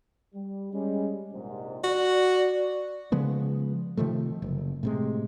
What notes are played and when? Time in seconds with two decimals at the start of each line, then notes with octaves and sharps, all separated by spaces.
0.34 G3
0.72 G3 G#3 C#4
1.33 A#1 G#2 C3
1.84 F#4 D5
3.12 C#3 F3 G#3 B3
3.97 C3 D#3 F3 A3
4.42 F#1
4.83 A2 C3 G#3